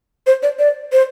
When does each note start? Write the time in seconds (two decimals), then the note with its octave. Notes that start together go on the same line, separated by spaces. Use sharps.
0.27 C5
0.43 D5
0.59 D5
0.92 C5